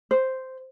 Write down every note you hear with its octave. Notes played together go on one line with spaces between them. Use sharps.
C5